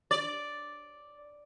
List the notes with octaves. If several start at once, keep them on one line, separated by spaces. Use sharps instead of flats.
D5